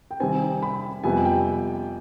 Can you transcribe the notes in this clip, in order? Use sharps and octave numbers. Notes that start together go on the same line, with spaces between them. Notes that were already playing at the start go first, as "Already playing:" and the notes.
G5
C3 D#3 G3 C4 G#5
B5
F2 C3 G3 B3 G#5
G5